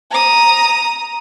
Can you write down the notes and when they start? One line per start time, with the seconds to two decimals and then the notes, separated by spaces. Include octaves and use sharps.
0.11 A#5 D#6